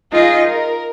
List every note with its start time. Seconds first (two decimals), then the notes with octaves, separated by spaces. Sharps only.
0.11 D#4 F4 G#4 D#5
0.48 A#4